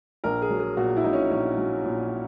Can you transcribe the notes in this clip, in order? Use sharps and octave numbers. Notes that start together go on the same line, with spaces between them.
A#1 A#4
G#4
F#3
G#4
A#2 F#4
E4
A#1 D#4
C#4
A#1 C#4
F#3
A#2